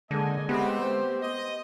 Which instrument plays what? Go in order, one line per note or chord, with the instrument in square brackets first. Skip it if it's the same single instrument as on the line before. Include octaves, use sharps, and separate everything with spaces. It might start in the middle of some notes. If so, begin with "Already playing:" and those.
[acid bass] D3 [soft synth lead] G#3 [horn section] A#3 D#5 G#5
[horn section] A3 C4 [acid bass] B3 [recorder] G4
[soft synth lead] C5
[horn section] D#5